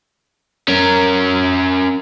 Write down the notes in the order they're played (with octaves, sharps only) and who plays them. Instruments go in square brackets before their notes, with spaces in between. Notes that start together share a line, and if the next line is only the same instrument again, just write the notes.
[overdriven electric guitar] C#4 A#4